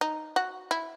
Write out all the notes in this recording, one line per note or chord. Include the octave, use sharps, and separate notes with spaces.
D#4
F#4
E4